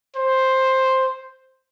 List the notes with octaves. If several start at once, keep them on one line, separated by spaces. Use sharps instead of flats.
C5